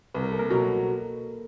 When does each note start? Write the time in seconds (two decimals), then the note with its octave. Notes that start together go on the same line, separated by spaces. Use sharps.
0.14 C2 B4
0.23 A#4
0.32 A4
0.39 A#3 A#4
0.50 B2 F#3